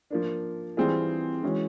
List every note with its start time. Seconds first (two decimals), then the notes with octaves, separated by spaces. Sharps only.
0.10 F3 A#3 D4
0.77 E3 G3 C4 F4 G#4
1.43 E3 G#3 C#4 F#4